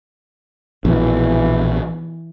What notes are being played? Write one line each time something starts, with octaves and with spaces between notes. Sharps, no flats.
A#1 B2 E3